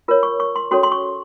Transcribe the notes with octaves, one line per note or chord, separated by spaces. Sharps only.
F4 A#4 C#5
C#6
C#6
C6
C#4 F#4 A4 C#5 C6
C6
C#6